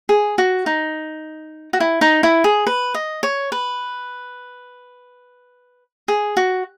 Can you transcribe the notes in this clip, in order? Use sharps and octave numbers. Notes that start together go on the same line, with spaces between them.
G#4
F#4
D#4
F#4
E4
D#4
E4
G#4
B4
D#5
C#5
B4
G#4
F#4